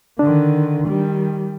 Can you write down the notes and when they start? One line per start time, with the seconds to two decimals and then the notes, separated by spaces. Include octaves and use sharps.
0.19 D3 D#3 D4
0.87 D#3 G3